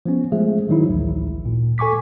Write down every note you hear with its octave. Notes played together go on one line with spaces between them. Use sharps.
F3 B3 C#4
F3 G#3 A3 G#4 E5
D#3 F#3 D#4 E4
A1 D2
A#2
A4 G#5 C#6 D6 B6